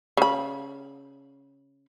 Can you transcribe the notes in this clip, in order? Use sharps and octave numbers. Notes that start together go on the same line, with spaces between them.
C#3 B5